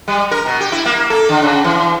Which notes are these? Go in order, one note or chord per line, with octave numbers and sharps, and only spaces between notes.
G3
A#4
B2
G4
E4
A#3
A4
D3
C#3
E3